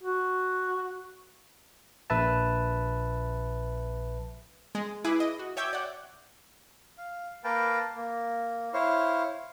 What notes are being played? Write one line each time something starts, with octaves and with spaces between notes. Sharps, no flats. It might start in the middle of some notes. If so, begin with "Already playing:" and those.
F#4
A#1 B4 E5 A5
G#3
E4 G#4 B4 B5 D6
D#5
F#4
C#5 E5 G5 D6 G6 G#6
D5 F#5
F5
A#3 A#4 B4 F5 G5 A5
A#3
E4 C5 C#5 F5